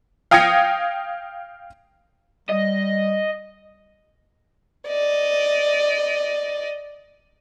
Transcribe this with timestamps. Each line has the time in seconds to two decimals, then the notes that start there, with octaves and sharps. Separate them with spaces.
0.31 F5 G5 D#6 G#6 A#6 C#7
2.49 G3 D#5
4.88 D5 D#5